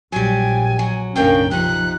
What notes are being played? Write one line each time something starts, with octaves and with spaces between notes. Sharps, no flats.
A#1 F#3 G3 G#5
F#3
F#1 B1 A2 A#3 C#4 D4 G5
B1 C3 F3 D#4 F#6